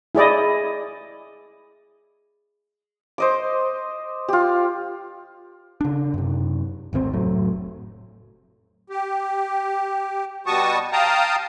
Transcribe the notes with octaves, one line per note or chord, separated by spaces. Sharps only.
E4 G#4 D5 D#5
C5 D#5 D6
F4 G4
C#3 D4
F#2 C3
G#1 D2 D3 C4
F1 A2 F#3 A3
G4
B2 G3 F#4 A5 C#6 D#6
F5 G5 A5 A#5 D#6